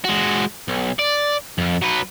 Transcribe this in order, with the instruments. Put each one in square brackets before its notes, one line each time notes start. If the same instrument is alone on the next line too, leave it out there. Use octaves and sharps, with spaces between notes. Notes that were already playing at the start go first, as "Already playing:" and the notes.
[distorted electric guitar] G#3 F#4
B1
D5
F2
F#3 B4